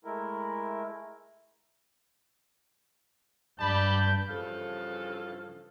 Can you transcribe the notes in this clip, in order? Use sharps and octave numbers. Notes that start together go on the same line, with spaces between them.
G#3 A3 E4 A#4
G2 D5 A5 B5 G6
G2 C#3 E3 F3 A4 F5